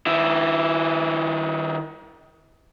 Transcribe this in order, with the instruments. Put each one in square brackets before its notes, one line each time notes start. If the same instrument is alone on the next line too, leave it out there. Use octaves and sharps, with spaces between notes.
[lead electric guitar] D#3 E4